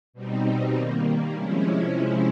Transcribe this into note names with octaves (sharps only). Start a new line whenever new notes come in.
B2 G3 C4 D#4
D#3 G3 A#3
C3 F3 G#3 C#4 E4